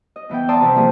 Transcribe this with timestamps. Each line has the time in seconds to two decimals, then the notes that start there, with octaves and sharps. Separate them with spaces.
0.16 D#5
0.29 E2 E3 B3 G5
0.49 D5 E5 A5 A#5 C6 D#6
0.60 C3 E3
0.75 E3 F3 G3 A#3 G#4 C5